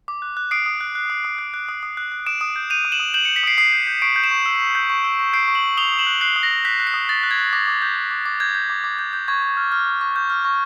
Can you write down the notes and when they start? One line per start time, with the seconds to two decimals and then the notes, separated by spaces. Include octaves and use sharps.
0.08 D6
0.22 F#6
0.37 F#6
0.51 D#6 C7 D7
0.66 D#6
0.81 F#6
0.95 F#6
1.10 D#6
1.25 D#6
1.39 F#6
1.54 F#6
1.68 D#6
1.83 D#6
1.97 F#6
2.12 F#6
2.26 D#6 D7 E7
2.41 D#6
2.56 G6
2.70 G6 D#7 F7
2.85 D#6
2.92 E7 F#7
3.00 D#6
3.14 G6 E7 F#7
3.25 C#7 D#7
3.29 G6
3.36 B6 C#7
3.43 D#6 C7 D7
3.58 D#6 C7
3.73 G6
3.87 G6
4.02 C#6 C7 D7
4.16 G6
4.24 D7 E7
4.31 C#6
4.46 E6
4.61 C#6
4.75 G6
4.90 C#6
5.04 E6
5.19 C#6
5.33 G6 C7 D7
5.48 C#6
5.55 E7 F#7
5.63 E6
5.77 D#6 F7 G7
5.92 D#6
5.99 E7 F#7
6.07 F#6
6.21 F#6 C7
6.36 D#6
6.43 A#6
6.50 D#6
6.65 F#6 B6
6.80 F#6
6.87 C7
6.94 D#6
7.09 D#6 A6
7.23 F#6
7.31 G#6
7.38 F#6
7.53 D6 A#6
7.67 D6
7.82 G6
7.96 G6
8.11 D6
8.26 D6
8.40 G6 G#6
8.55 G6
8.70 D6
8.84 D6
8.99 G6
9.13 G6
9.28 C#6 G#6
9.42 C#6
9.57 F6
9.72 F6
9.87 C#6
10.01 C#6
10.16 F6 G6
10.30 F6
10.45 C#6